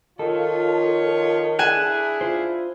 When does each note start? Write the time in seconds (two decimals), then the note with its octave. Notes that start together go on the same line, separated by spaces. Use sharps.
0.19 D#3 F3 F4 A4 C#5
1.59 D4 E4 G#4 G#5 F#6 E7
2.21 F4 C5